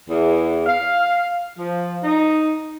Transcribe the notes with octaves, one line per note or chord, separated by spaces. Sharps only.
E2
F5
F3
D#4